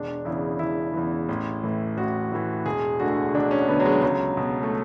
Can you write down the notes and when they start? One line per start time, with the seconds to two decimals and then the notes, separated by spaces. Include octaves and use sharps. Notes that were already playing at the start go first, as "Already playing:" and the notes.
Already playing: E1 D4
0.25 E2 C#3 E3 E4
0.59 E1 E4
0.94 E2 C#3 E3
1.29 A1
1.63 A2 E3
1.97 A1 F#4
2.32 A2 E3
2.65 E1 G#4
3.00 D2 D3 F#4
3.34 E1 D4
3.51 C#4
3.68 D2 D3 B3
3.80 F#3
3.86 G#3
4.02 C#2 F#3
4.37 B2
4.63 A3